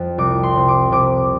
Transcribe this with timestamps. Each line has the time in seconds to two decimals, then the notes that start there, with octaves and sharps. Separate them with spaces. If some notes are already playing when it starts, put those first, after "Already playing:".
Already playing: F2
0.18 C2 D6
0.43 C6
0.56 C3
0.68 D6
0.92 C3 D6